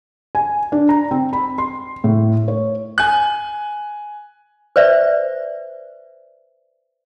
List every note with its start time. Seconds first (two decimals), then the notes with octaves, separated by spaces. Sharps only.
0.35 G#5
0.72 D4
0.89 A#5
1.11 C4
1.33 B5
1.58 C6
2.04 A2
2.48 C#5
2.98 G#5 F#6
4.76 B4 C5 D5 E5